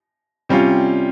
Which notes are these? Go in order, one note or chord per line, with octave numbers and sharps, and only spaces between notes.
C3 G3 C#4 F4